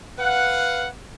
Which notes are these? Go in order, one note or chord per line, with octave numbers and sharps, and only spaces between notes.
B4 F5 F#5